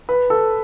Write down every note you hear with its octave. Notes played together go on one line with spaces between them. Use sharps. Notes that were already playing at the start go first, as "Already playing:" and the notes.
B4
A4